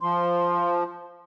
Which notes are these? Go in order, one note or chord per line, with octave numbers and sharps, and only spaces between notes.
F3 C6